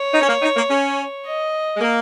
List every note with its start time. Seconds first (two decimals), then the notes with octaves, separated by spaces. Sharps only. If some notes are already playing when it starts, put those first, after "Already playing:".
Already playing: C#5
0.14 D#4
0.22 C#4
0.29 A#3
0.42 D#4
0.56 A#3
0.70 C#4
1.26 D#5
1.77 G#3
1.81 A#3